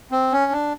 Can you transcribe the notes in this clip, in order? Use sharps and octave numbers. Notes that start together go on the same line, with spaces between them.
C4
C#4
D4